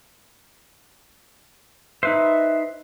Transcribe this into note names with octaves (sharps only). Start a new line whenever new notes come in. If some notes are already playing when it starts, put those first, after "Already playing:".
D#4 B4 C5 E5